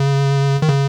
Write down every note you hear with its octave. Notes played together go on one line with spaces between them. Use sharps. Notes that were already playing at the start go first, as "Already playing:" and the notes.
Already playing: C#3
D#3
C#3